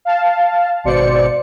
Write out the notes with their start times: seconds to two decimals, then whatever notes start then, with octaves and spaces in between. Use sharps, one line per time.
0.05 F5 A5
0.84 G#1 B2 C5 D5 C#7